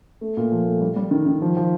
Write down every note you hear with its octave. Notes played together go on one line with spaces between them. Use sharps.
A3
A#2
F3
A3
G3
G3
D#3
D#3
F3
F3